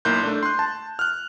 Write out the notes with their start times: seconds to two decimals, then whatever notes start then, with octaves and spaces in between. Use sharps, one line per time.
0.05 B1 A#3 E4 C6 F#6 G6
0.23 A3 D4
0.43 C6 F#6
0.59 A5
0.99 F6 F#6